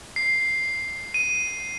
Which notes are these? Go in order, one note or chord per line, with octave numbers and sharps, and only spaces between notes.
C7
D#7